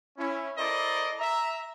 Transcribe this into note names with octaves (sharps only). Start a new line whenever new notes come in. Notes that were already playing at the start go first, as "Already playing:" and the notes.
C#4 E4
E4 A4 A#4 C5 D5 D#5
E5 A#5